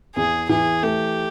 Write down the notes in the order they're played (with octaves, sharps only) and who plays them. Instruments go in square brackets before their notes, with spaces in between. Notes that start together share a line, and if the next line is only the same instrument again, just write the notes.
[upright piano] E2 [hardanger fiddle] G#4
[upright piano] E3 [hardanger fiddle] G#4
[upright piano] A3 [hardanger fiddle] G4